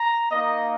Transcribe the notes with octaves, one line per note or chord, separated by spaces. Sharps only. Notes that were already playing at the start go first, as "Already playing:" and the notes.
Already playing: A#5
A#3 D#4 D#5